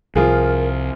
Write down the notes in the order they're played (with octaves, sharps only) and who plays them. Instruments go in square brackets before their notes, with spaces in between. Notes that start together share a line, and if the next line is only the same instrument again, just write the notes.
[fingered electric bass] C2 [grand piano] F3 F4 G#4 [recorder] A#4